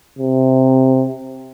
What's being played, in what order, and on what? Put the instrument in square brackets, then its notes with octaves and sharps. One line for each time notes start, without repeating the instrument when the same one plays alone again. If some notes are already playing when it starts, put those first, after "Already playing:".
[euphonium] C3